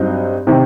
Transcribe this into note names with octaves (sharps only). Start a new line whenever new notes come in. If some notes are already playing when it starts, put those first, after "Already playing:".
Already playing: G2 F#3 C4 D#4
C3 D#3